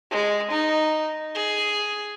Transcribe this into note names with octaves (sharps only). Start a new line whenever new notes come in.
G#3
D#4
G#4